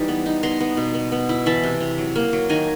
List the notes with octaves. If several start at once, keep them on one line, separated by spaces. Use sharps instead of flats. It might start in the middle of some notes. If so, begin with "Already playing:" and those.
Already playing: E3 G3 D#4
B3
D#4
B3 A#5 C6
B3
B2
B3
B3
E4
E3 A5 B5
C3
C3
F#3
A#3
F#3
D#3 G#5 A#5